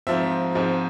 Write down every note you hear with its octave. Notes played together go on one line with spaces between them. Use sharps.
G#2 F3 C4 E5
G#2 F3 G#3 C4